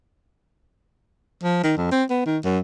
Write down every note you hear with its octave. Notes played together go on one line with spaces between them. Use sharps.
F3
D#3
F2
C4
B3
D#3
F#2